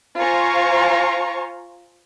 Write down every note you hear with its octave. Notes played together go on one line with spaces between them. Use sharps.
F4 C5 F5 G#5 A#5 C#6